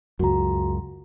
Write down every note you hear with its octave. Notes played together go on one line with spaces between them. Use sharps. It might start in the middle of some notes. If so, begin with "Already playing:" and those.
C#2 F#2 F#4 A#5